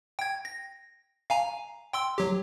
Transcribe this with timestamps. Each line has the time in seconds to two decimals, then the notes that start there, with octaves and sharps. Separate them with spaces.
0.19 G5 G#6
0.45 A#6
1.30 F5 G#5 A#5
1.93 G5 C6 E6
2.18 F#3 G4